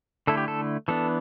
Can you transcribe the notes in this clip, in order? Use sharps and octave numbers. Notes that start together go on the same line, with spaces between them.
D3 A3 E4 A4
G4
A4
E3 B3 D4 A4